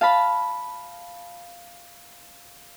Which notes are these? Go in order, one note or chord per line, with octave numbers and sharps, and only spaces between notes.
F5 A5 B5